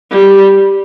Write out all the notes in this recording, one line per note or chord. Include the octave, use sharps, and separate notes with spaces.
G3